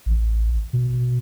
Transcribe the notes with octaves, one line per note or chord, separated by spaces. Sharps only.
A1
B2